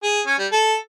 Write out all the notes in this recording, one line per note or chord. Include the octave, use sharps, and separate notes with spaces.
G#4
C#4
G3
A4